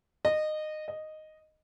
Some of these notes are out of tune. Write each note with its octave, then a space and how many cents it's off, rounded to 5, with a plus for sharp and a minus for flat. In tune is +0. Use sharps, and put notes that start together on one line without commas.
D#5 -20
D#5 -5